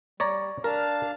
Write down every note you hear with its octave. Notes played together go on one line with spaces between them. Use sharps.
G3 C#5 D5 A#5
D4 A#4 F5 A5